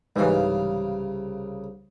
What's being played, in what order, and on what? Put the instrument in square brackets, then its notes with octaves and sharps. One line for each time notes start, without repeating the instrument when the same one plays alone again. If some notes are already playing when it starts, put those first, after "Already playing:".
[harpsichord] C2 C#3 F5 [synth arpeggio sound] G#2 E3